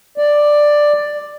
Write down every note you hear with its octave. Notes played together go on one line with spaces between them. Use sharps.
D5